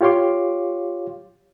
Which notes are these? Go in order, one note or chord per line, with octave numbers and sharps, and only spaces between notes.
F4 G4 C#5 F5 C6 D6